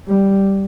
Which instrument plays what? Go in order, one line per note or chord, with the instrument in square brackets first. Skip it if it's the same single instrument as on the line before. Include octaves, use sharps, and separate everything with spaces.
[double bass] G3